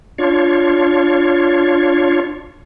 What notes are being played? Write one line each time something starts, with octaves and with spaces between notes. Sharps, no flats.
D4 F4 C#5